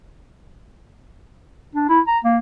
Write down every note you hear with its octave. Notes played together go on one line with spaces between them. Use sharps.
D4
E4
A#5
A#3